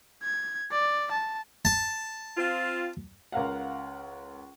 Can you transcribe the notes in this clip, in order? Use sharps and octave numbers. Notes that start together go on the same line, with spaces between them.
G#6
D5
A5
A5
C4 F4
C#2 A#4 F5 F#5